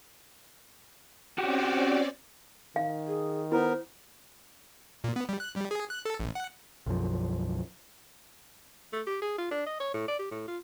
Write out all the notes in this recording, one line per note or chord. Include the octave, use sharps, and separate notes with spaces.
C4 C#4 F#4 G4 D5
D#3 F5
G#4
B3 E4 A#4 C5
A#2
B3
G3
F#6
G3
G#4
F#6
A4
A1
F#5
B1 F#2 F3
A3
G4
G#4
F4
D4
D#5
C#5
A2
D5
G4
A2
F4